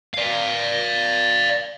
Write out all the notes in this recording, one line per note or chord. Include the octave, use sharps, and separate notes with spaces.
D5 F5